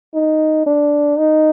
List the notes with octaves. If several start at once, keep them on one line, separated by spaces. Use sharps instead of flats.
D#4
D4
D#4